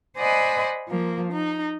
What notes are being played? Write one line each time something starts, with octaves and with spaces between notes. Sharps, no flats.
C5 D5 D#5 F#5 G#5 B5
F3 A#3
D#4